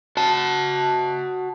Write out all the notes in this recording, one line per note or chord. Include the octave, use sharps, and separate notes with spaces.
F#4 A5